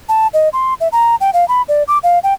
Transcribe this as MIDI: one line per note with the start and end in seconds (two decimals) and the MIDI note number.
0.09 0.27 81
0.34 0.49 75
0.53 0.74 84
0.81 0.88 76
0.92 1.16 82
1.21 1.30 79
1.33 1.47 77
1.48 1.62 83
1.69 1.83 74
1.88 1.98 86
2.03 2.19 77
2.24 2.34 79